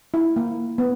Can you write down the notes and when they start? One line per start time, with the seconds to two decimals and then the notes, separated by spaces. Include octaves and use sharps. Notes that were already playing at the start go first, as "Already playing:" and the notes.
0.14 E4
0.36 A#3
0.78 B3